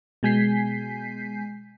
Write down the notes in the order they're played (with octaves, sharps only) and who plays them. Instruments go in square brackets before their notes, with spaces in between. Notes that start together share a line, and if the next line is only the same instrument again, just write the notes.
[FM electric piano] B2 G#3 G#5 G6 B6 C7